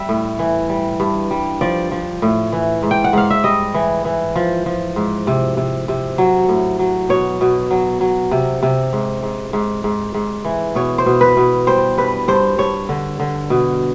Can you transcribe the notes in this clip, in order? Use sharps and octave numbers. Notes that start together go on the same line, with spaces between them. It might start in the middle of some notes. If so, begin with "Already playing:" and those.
Already playing: G3 E5
A2
E3
G3
G2
G3
F3 D5
F3
A2
E3
G#2
G5
F#5
G#2 F5
E5
G3 D#5
E3
E3
F3
F3
G#2
C3
C3
C3
F#3
A2
F#3
B2 C#5
B2
F#3
F#3
C3
C3
G#2
G#2
G#2
G#2
G#2
E3
B2 C#5
C5
B2
B4
B2
G3 C5
G2 B4
G2 C5
G2 C#5
D3
D3
B2